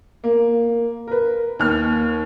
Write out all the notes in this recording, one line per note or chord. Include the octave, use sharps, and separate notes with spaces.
A#3
A#4 B4
D#2 F6